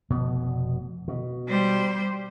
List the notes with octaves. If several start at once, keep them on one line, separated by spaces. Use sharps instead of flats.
F1 B2 B3
B2
G3 C5